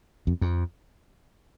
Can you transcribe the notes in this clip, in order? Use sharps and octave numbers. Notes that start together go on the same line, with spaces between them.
F2
F2